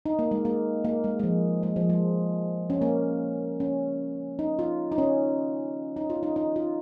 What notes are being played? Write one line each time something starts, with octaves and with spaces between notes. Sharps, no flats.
D#4
A#3
G#3
A#3
A#3
G#3
G#3
F3
G#3
F3
G#3
C#4
A#3
C#4
D#4
F4
D#4
C#4
D#4
F4
D#4
D#4
F4